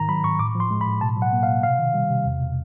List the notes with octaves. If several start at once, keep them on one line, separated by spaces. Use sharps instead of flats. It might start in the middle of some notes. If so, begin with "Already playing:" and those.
Already playing: G#2 D#3 A#5
F#3 B5
G#2 C#6
A2 D6
F3
C6
G#3
B5
A2
B2 A5
F#3
F#5
A#3
F5
B2
C3 F5
D#3
G3
C3
E2
B2